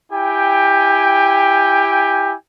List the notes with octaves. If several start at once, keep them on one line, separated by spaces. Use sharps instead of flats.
E4 G4 G5 G#5